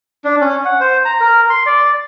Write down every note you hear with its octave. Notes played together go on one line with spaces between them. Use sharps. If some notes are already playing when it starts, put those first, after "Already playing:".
D4
C#4
F#5
C5
A#5
A#4
C6
D5